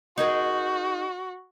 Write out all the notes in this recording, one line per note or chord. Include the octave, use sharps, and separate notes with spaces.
D#4 F#4 G#4 A#4